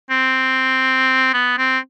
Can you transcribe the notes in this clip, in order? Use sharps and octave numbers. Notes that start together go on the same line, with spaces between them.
C4
B3
C4